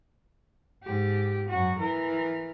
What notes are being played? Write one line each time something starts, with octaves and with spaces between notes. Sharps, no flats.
G#2 G4
F#2 F#4
E3 A#4